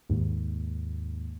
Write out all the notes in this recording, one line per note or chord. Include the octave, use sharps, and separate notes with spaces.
D#2 G#2